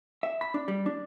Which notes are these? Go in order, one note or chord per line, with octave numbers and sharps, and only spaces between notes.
E5
B5
D4
G3
D4